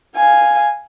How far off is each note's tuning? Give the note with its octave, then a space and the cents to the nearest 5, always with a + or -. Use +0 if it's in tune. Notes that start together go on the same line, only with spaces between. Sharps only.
F5 +0 G#5 +0